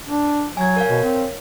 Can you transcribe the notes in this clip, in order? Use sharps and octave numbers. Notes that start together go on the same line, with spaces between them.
D4
F#3 G#5 G#6
A#4 C#5 F5
B2
C4